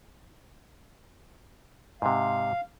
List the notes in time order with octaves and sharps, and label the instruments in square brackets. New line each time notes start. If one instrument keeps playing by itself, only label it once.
[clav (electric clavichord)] G#2 C3 [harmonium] F5